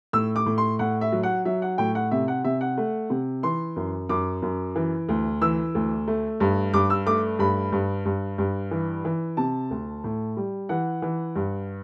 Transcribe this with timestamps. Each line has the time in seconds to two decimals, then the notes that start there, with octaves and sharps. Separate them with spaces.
0.13 A2 E6
0.36 D6
0.46 A2
0.58 C6
0.79 A2 F#5
1.01 E5
1.12 F#3
1.23 F#5
1.45 F#3 E5
1.62 F#5
1.78 A2 G5
1.95 F#5
2.11 C3 E5
2.28 F#5
2.44 C3 E5
2.61 F#5
2.78 A3
3.10 C3
3.43 E3 C6
3.76 F#2
4.09 F#2 D6
4.42 F#2
4.76 E3
5.09 D2
5.42 E3 E6
5.75 D2
6.08 A3
6.40 G2
6.74 G2 D6
6.90 E6
7.06 A3 D6
7.39 G2 B5
7.72 G2
8.05 G2
8.38 G2
8.71 E3
9.05 E3
9.37 C3 A5
9.71 D2
10.04 A2
10.37 G3
10.69 E3 F#5
11.02 E3
11.36 G2